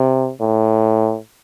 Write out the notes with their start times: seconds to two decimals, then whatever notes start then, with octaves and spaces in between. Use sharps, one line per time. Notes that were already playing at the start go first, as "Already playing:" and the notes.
Already playing: C3
0.40 A2